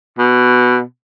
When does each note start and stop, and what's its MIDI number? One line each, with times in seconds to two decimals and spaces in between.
0.19 0.81 47